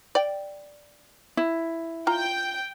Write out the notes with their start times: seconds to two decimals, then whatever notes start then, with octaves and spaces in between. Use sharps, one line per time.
0.15 D5 G5
1.37 E4
2.07 F4 G5 A#5 G6